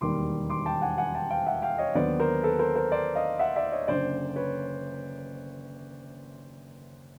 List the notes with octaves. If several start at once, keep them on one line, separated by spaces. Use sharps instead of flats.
E1 D#2 D#3 G3 A#3 C6 D6
C6 D6
G5 A5
F#5 G#5
F#5 G#5
G5 A5
F5 G5
E5 F#5
F5 G5
C#5 D#5
D#2 D3 F#3 B3 C5 D5
A#4 C5
A4 B4
A#4 C5
A#4 C5
C5 D5
D#5 F5
E5 F#5
D5 E5
C#5 D#5
F#1 F#2 D3 C5 D5
B4 C#5